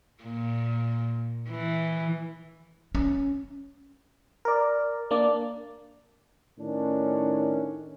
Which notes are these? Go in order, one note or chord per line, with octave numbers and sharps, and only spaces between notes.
A#2
E3
C#4
A#4 D5
A#3 D4 D5
A2 D#3 C#4 D4